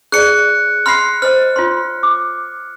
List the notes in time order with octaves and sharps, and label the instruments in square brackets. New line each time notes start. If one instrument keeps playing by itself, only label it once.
[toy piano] G#4 C#5 D5 [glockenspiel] F#6 C#7
[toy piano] E5 B5 C6 [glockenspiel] F6 C7
[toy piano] C5 D#5 [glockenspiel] F6
[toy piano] F4 C#5 C6
D6